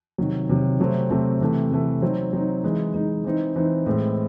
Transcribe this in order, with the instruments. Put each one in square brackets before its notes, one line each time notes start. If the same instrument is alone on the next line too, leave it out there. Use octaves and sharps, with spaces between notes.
[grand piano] C3 D#3 F#3
C3 D#3 F#3
C3 F#3 A3 C4
C3 F#3 A3 C4
C3 E3 A3
C3 E3 A3
F#3 C4 D#4
F#3 C4 D#4
E3 G#3 D#4
E3 G#3 D#4
E3 C4 D#4
E3 C4 D#4
A2 E3 G#3 C4